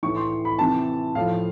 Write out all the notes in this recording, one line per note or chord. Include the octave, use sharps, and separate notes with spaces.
A2 E3 C#6
C6
B5
C3 E3 A5
A2 F3 F5